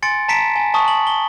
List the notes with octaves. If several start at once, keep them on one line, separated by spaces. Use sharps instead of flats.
G#5 C6 A6 C#7 D7
A5 A#5 B6 C#7 D7 E7
G#5
A5 C#6 D#6
F#7
G7